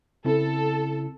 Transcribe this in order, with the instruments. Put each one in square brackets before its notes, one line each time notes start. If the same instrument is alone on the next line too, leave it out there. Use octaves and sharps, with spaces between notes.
[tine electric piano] C#3 C4 E4 [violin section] A4